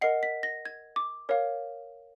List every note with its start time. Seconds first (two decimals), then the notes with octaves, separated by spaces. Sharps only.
0.01 A#4 D#5 F#5 C7
0.23 B6
0.43 A#6
0.65 G#6
0.96 D6
1.29 A#4 C#5 F5